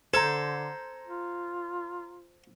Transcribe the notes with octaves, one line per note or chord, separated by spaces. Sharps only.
D3 A4 C5 A#5 G#6
F4